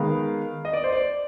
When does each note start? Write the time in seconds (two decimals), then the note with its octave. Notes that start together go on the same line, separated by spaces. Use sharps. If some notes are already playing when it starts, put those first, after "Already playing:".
Already playing: D#3 G#3 B3 F5
0.65 D#5
0.73 D5
0.84 C5
0.93 D5